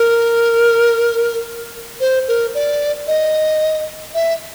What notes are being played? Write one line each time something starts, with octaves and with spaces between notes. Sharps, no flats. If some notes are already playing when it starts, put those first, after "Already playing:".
Already playing: A#4
C5
A#4
D5
D#5
E5